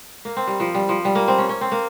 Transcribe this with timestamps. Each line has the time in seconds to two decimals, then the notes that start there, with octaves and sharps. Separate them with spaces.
0.25 A#3
0.36 C4
0.47 G3
0.60 F3
0.75 G3
0.89 F3
1.05 G3
1.15 A#3
1.28 C4
1.38 C#4
1.49 C#4
1.61 C4
1.72 A#3